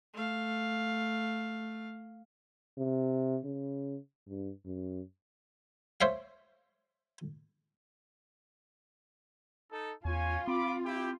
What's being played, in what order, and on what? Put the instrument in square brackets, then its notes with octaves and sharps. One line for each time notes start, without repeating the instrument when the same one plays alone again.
[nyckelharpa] A3 F5
[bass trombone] C3
C#3
G2
F#2
[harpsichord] C5 C#5 E5 F5
[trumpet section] D#4 A4
[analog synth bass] E2 [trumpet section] C#4 C#5 G#5 [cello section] F4
[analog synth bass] C4 [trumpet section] B5 D6
[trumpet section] E4 G4